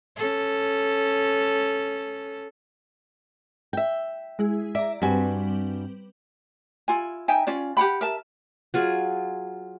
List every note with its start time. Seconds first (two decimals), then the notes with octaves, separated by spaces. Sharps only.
0.17 C#4 A4
3.73 E5 G5
4.39 G#3 E4 G#4
4.75 D5 E5 A#5
5.02 G2 G3 C4 F#4 B4 G#5
6.88 E4 F4 G#5
7.28 D#4 E5 G5 G#5
7.47 C#4 F4 D5
7.77 G4 F#5 G5 B5
8.01 A#4 E5 A5
8.74 F#3 F4 G#4 G#5